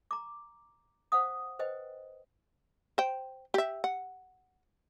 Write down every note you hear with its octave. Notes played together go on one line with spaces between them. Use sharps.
A#5 D6
C5 F5 F#5 D#6
B4 C5 D#5 G5
C5 G5
G4 E5
F#5